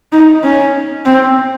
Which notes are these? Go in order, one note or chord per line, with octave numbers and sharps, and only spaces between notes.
D#4
C#4
C4